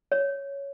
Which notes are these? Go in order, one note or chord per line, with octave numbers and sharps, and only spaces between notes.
C#5